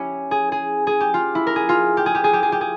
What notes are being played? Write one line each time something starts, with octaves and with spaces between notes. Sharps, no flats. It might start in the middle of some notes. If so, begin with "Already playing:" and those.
Already playing: C#4 E4 G4
G#4
G#4
G#4
G4
F4
E4
A#4
G#4
F4
G4
G#4
G4
G#4
G4
G#4
G4
G#4